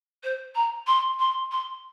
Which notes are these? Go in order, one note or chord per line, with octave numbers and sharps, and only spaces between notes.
C5
A#5
C6
C6
C6